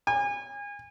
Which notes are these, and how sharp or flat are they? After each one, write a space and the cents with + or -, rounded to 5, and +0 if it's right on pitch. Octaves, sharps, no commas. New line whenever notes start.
G#5 -30